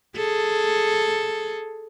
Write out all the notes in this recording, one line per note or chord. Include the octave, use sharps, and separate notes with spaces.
G#4 A4